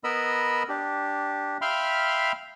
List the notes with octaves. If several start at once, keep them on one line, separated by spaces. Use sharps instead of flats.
B3 A#4 D#5 B5 E6
D4 G4
E5 F5 G5 B5 C6 F6